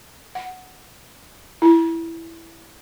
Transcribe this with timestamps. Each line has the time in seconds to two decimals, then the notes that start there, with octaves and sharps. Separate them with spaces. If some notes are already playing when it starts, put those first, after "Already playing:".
0.35 F#5
1.62 E4